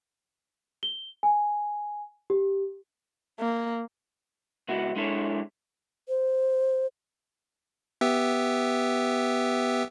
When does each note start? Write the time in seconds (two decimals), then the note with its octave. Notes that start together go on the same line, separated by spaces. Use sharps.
0.83 G7
1.23 G#5
2.30 G4
3.40 A#3
4.68 C#2 B3 E4 F#4
4.96 G#3 D4 E4 A4 B4 C#5
6.09 C5
8.01 B3 G4 E5